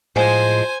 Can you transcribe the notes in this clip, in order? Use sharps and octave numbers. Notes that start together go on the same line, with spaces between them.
A2 F3 G#3 C5 G#5